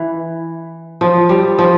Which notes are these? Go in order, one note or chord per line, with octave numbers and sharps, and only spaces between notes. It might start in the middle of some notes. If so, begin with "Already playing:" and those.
Already playing: E3
F3
G3
F3